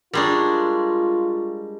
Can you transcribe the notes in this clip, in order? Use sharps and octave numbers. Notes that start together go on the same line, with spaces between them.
G3 G#3 D4 F4 A#4 A#5 C#6